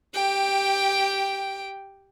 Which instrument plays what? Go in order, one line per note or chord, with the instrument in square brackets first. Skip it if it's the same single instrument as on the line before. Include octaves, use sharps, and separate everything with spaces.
[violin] G4 G5